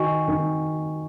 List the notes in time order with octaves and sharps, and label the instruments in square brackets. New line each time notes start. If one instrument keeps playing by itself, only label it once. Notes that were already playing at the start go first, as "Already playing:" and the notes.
Already playing: [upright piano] D#3 [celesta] F#4 D#5 G#5 C#6
[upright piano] D#3